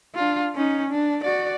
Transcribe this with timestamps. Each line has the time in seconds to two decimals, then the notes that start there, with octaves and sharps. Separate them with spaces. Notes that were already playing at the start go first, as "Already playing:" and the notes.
0.15 D4 F4
0.56 C#4 D#4
0.90 D4
1.24 F#4 D5